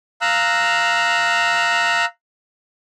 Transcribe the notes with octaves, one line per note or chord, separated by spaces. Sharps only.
F5 A#5 E6 F#6